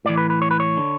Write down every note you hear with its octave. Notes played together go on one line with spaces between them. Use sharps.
A2 E3 D5
B4
B4
C#5
B4
C#5
D3